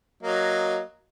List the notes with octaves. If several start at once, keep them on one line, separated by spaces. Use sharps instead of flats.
F#3 A#3 D#5